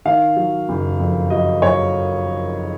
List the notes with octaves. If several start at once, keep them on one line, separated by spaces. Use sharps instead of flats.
D#3 F5
F#3
F#1
F2
F#3 D#5
F#3 C#5